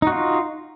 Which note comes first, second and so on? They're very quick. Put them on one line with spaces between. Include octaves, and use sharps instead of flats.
D#4 F#4 F4